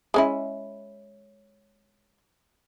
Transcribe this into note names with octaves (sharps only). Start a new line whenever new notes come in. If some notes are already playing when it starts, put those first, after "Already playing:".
G#3 C#4 E4